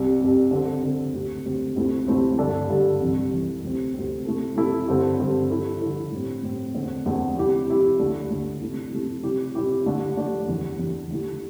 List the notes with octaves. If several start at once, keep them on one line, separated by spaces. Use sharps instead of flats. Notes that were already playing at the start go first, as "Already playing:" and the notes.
Already playing: C2 C3 G3
C2 C3 G3
D3 C4 A4
D3 C4 A4
D2 D3 C4 G4
D2 D3 C4 G4
D2 C3 A3 C4 E4
D2 C3 A3 C4 E4
G2 D3 G3 D4 A4
G2 D3 G3 D4 A4
C2 C3 E3
C2 C3 E3
D2 C3 G3 C4
D2 C3 G3 C4
C3 A3 E4 A4
C3 A3 E4 A4
G2 D3 C4 A4
G2 D3 C4 A4
D3 G3 E4 A4
D3 G3 E4 A4
A2 G3 C4
A2 G3 C4
E2 D3 A3 C4
E2 D3 A3 C4
C3 G3 E4 G4
C3 G3 E4 G4
D2 D3 A3 D4
D2 D3 A3 D4
C3 A3 E4
C3 A3 E4
C3 G3 E4 G4
C3 G3 E4 G4
D3 A3 D4 G4
D3 A3 D4 G4
E2 E3 G3 D4
E2 E3 G3 D4
D3 A3 E4 G4